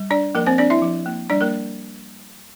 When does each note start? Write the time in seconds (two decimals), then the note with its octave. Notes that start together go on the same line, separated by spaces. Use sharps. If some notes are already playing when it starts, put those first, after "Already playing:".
Already playing: G3
0.11 D4 D5
0.35 F3 A#3 A#4
0.47 C4 C5
0.58 C4 D4 D5
0.70 E4 E5
0.82 F3
1.06 A#3
1.30 G3 D4 D5
1.41 A#3 A#4